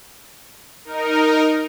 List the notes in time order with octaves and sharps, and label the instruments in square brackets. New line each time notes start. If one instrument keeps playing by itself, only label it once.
[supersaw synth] D#4 A#4